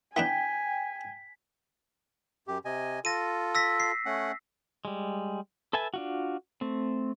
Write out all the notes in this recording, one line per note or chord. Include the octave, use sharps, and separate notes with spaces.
E3 B3 D4 G5 G#5 B6
F#2 G4
C3 D#5 G#5
F4 A4 A#6 D#7
E6 A#6 B6
C7
A3 C#4 F#5
G3 G#3
A4 B4 E5 G#5 A5
D4 F4 F#4
A3 C4